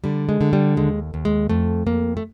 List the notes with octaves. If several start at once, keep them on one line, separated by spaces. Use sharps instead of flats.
D3 G3
G#3
D3
G3
D#2 G#3
D#2
G#3
F2 A3
F2 A#3
A3